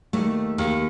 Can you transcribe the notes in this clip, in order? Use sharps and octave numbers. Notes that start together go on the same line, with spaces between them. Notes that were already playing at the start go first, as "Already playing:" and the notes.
D#2 A3
D#2